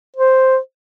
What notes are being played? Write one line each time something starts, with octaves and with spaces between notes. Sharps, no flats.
C5